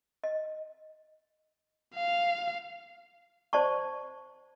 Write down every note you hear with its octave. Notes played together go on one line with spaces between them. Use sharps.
D#5
F5
C5 D5 A5 C#6